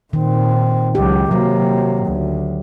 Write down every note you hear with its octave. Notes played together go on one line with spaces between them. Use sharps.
A#2 D#3 C4
C#2 F#3 G4
C3 F#3 A#3
D2